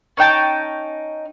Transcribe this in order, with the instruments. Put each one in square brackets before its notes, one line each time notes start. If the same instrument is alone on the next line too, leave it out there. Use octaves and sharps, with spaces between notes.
[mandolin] C#4 D#4 G5 A5